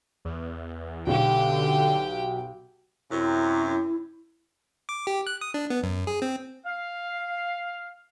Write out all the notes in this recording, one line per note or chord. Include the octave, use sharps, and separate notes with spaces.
E2
B1 D3 F#4 G4 G5
F#2 C3 E4
D6
G4
F#6
D#6
D4
B3
F#2
G#4
C4
F5